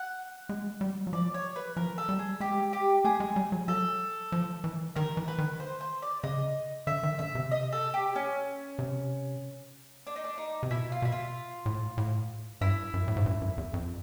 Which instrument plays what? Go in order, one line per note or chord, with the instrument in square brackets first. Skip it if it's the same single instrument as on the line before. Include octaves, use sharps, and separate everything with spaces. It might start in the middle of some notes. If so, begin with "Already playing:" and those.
Already playing: [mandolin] F#5
[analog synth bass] G#3
G3
F#3
[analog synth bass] F3 [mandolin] D5
[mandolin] C#5
B4
[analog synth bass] F3 [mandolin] A#4
[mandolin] A4
[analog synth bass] G3
[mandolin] G#4
[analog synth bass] G#3 [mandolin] G4
[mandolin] G4
[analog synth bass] A3 [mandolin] G#4
[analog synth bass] G#3
G3
F#3
[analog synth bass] F#3 [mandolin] A4
[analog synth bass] F3
E3
[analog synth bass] D#3 [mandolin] A#4
[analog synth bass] E3
[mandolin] B4
[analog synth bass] D#3
[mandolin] C5
C5
D5
[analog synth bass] C#3 [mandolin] D#5
[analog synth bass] D3 [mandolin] E5
[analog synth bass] D#3
[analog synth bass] D3 [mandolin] E5
[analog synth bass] C3
[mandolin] D#5
A4
G4
C#4
[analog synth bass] C3
[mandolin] D4
D#4
D4
D#4
[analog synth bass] C3
[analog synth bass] B2 [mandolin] E4
[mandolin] F4
[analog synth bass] B2 [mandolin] E4
[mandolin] F4
[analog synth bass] A2
A2
[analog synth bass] G2 [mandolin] E4
[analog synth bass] F#2
A2
G#2
G2
F#2
E2
F2